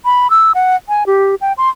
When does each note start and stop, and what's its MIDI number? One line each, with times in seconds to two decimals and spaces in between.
0.05 0.30 83
0.30 0.52 88
0.55 0.76 78
0.89 1.03 80
1.07 1.35 67
1.41 1.53 79
1.58 1.69 84